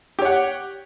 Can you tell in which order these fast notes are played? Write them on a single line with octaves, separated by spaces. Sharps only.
G4 C#5 F#5